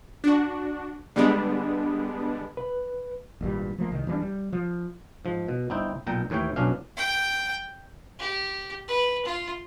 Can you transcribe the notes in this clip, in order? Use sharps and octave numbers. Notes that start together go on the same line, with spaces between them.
D4 F#4
D3 G3 G#3 B3 D4
B4
G#1 G2 A#2 G3
F3 A3 A#3
C2 D#3
D1 E3 G3 D4
G3
F3
G#2 F3
B2
G1 C4 D#4 E4 G5
B1 A#2 G5 A#5
D#2 A2 E3 C#5 G5
B1 F#2 B2 C#4 D4 F5
G5
G4
B4
F4